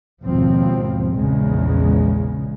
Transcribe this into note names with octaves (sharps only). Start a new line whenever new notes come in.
G#1 D#2 B2 F3 C4
A#1 E2 C#3 G#3